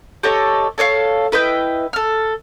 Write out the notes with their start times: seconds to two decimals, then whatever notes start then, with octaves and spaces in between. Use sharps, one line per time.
0.23 G4 A4 C#5 D#5
0.78 A4 C#5 D5 F5
1.32 E4 B4 D#5 G5
1.93 A4 F6